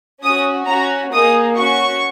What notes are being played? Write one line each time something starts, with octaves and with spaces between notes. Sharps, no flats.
C#4 F#4 D#6
C#4 F#4 A#5
A#3 D#4 G#4 D#6
C#4 F#4 C#6